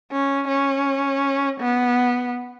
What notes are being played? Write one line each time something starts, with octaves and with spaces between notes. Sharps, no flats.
C#4
C#4
B3